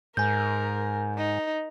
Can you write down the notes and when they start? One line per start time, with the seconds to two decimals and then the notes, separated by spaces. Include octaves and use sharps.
0.17 G#2 A#4 G#5 G6
1.18 D#4